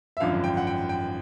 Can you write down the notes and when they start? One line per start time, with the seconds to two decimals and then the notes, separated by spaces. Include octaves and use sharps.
0.17 E5
0.20 G#1 F#2 D3 F3 F5
0.44 G5
0.57 F#5
0.67 G5
0.89 G5